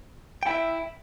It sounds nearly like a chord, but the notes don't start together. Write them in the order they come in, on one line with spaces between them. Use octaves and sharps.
G5 E4 E5